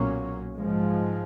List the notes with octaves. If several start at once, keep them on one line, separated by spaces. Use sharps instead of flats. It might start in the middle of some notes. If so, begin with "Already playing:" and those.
Already playing: B1 A#2 F#3 A#3 C#4
G#2 F3 G#3